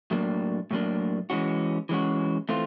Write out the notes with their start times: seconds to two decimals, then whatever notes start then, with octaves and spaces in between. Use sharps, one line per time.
0.11 A2 F#3 A#3 D4
0.71 A2 F#3 A#3 D4
1.30 E3 G#3 C#4 F#4
1.89 E3 G#3 C#4 F#4
2.49 E3 A3 C4 F4